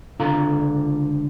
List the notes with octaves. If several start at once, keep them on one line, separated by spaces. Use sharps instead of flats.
C#2 D3 F4 A4 F5 A#5